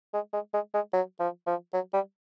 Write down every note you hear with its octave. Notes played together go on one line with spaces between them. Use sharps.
G#3
G#3
G#3
G#3
F#3
F3
F3
F#3
G3